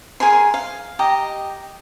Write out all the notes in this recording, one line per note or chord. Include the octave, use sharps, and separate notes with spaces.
G#4 A#4 G#5 C6
F5
G4 D#5 A#5